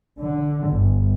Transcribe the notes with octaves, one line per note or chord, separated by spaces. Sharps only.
D3
G1